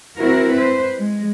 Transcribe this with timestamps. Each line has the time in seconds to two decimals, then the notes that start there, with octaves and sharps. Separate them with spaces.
0.17 C4 E4 F#4 A#4
0.56 B4 C5
0.98 G#3